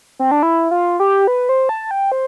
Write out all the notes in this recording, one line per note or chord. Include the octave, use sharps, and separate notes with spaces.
C4
D4
E4
F4
G4
B4
C5
A5
G5
C5